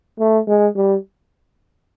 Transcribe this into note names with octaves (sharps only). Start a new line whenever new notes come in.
A3
G#3
G3